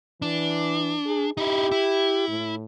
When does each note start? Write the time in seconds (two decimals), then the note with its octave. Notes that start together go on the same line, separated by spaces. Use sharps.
0.22 E3 D4
1.06 G#4
1.37 D#4 E4 G4
1.72 E4
2.28 A2